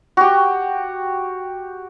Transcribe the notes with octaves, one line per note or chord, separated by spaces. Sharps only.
F#4 G4